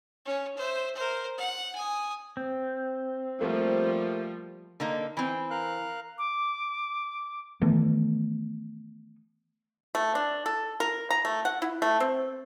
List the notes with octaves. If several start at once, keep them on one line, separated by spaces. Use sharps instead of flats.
C#4 C#5
C5 E5
A#4 C5
F#5
G#5 D#6
C4
F3 G3 A3 A#3
D3 A#3 D#4
E3 C4
A#4 F5 F#6
D6
D#3 E3 A3 B3
A3
D4
A4
A#4
A#5
A3
F#5
E4
A3
C4